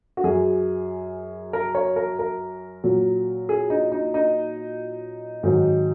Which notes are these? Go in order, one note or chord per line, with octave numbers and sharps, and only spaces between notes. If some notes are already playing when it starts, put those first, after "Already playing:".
F#4
F#2 F#3 G#4
A#4
C#5
A#4
A#4
A#2 F#3
G#4
D#4
D#4
D#4
G#2 D#3 F#3